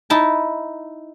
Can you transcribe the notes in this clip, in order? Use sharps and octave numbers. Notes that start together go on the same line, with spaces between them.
D#4 E4 A5